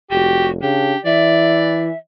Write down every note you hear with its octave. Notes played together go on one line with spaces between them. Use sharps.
F1 F#4 G4
C#3 D4 G4
E3 D5 E5